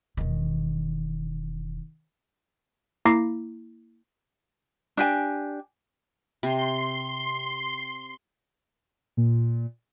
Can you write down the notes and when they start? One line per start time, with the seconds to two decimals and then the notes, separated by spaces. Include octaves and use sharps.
0.17 E1 D#3
3.05 A#3 E4 A#5 D6 A#6 C7
4.97 D4 G4 G#5
6.43 C3 C6
9.17 A#2